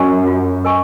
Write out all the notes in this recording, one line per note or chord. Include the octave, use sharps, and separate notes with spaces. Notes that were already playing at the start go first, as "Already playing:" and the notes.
Already playing: F#2 A#4 D#5 G#5 C#6
F4
A#4 D#5 G#5 C#6